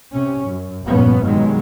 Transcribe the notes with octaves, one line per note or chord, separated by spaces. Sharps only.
C3 C#4
F#2
F1 G2 A#2 F3 B3 C#4
G2 B2 D#3 F#3 G#3